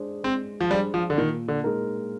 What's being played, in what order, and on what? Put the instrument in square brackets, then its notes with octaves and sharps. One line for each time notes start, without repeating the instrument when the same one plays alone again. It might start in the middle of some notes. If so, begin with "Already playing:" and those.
Already playing: [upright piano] G#3 D4 G#4 C5
[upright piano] G#3 [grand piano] C4
[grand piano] F3
[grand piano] G3 [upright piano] D4 G#4 C5
[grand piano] F3
D3
[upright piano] A#2 [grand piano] D#3
[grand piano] D3
[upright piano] G#3 D#4 A#4